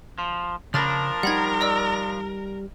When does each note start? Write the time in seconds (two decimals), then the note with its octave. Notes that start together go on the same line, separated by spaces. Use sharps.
0.18 F3
0.74 C#3 F3 D4 A#4 B5 F6 A6 A#6
1.23 G3 D#4 F#5 B5 G#6
1.61 D5 D#5 E6